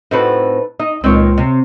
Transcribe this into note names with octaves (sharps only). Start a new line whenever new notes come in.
A2 C4 D#4 F#4 A4 B4
D#4 D#5
C#2 A#2 D#3 C4 C#5
C3